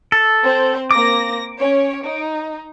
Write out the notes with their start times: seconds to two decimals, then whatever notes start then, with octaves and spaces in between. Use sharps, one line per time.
0.12 A4
0.43 C4 C5
0.91 A#3 C4 D6 A#6
1.59 C#4 C#5
2.04 D#4